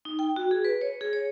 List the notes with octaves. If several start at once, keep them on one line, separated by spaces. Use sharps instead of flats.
D#4
G5
F#4
G#4
B4
C#5
G#4
C#5